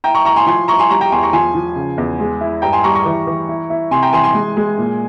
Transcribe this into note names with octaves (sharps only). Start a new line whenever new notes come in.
E4 G5 A#5
A#5 C#6
E4 A#5 C#6
G#5 C6
F3 G#5 C6
E4 A#5 C#6
G#5 C6
G3 A#5 C#6
G5 A#5
E2 G#5 C6
A#5 C#6
F3 G#5 C6
F3
C#3
E2
G#3
E4
G2 G5 A#5
G#5 C6
G3 A#5 C#6
A#5 C#6
E3
E3
E4
E4
C3 G#5 C6
G5 A#5
E3 G#5 C6
G#5 C6
G#3
G#3
A#2